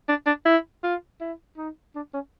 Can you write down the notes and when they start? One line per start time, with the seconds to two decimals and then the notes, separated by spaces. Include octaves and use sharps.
0.08 D4
0.26 D4
0.45 E4
0.83 F4
1.21 E4
1.57 D#4
1.95 D4
2.14 C#4